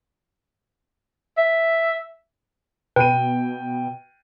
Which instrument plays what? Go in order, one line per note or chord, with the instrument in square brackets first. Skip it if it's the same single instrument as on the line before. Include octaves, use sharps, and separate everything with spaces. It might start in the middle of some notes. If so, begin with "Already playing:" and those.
[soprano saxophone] E5
[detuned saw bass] B2 [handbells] B4 [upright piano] G5 D#7